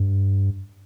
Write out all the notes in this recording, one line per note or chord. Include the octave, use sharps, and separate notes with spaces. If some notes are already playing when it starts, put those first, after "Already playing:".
Already playing: G2